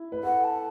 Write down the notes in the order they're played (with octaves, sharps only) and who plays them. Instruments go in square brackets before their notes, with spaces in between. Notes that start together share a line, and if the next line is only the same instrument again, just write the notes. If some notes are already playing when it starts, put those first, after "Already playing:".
Already playing: [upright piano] E4
B4
[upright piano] A4 [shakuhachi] F#5
[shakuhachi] A5